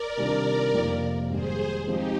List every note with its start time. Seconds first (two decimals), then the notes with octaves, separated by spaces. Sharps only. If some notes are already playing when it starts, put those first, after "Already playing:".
Already playing: A#4 D5
0.17 C3 D#3 G3 D4 F4
0.74 F2 C3 F3 A#3
1.30 G#2 D#3 G3 G#4 C5
1.87 F3 G#3 C4 D#4 G4